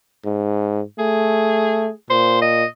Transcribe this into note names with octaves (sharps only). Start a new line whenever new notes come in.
G#2
A3 G#4
A#2 C5
D#5